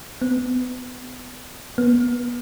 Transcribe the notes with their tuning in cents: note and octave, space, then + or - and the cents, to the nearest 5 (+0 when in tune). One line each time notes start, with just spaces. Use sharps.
B3 +25
B3 -25